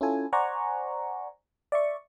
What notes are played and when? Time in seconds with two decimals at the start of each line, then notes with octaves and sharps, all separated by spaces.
0.01 C#4 E4 F4 A4 G#5
0.33 C5 D5 F#5 G#5 A#5 C#6
1.72 D5 E5 C#6